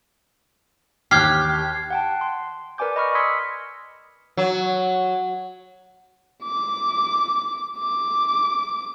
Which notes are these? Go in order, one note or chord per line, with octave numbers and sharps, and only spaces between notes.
D#2 G4 F6 F#6 G#6 C7
F#5 G5 A5
C6
A#4 B4 D5 G#5 D6 G6
D#5 B5 C#6 F6 A#6
C6 D#6 E6 G#6 B6 C#7
F#3
D6
D6